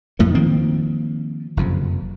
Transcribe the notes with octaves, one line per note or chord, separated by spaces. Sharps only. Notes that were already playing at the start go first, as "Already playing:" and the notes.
F2 A2 A3 A#3
D#3 F3 A#3 C4
F#1 F2 C3